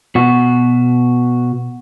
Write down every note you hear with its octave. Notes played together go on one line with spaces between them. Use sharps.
B2 F#4